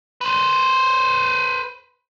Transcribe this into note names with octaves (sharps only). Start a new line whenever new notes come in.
B4 C5